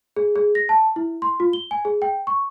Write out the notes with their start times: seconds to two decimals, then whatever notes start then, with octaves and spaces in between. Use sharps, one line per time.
0.16 G#4
0.36 G#4
0.55 A#6
0.69 A5
0.96 E4
1.22 C6
1.40 F4
1.53 G7
1.71 G#5
1.85 G#4
2.02 G5
2.27 C#6